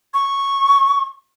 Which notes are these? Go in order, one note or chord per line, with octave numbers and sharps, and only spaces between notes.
C#6